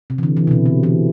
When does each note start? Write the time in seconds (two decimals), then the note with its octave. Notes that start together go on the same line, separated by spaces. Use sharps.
0.10 C3
0.18 E3
0.23 D3
0.37 E3
0.47 C3
0.51 B2
0.66 D3
0.83 E3